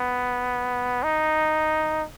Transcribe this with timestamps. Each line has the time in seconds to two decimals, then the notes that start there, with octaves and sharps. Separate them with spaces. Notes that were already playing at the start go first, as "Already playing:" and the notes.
Already playing: B3
1.03 D#4